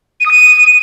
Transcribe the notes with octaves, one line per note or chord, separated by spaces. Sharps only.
D#7
D#6
D#7